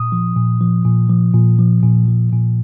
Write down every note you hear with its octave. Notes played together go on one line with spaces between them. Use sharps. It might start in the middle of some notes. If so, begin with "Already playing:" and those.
Already playing: A#2 D#6
F3
A#2
F3
A#2
F3
A#2
F3
A#2
F3
A#2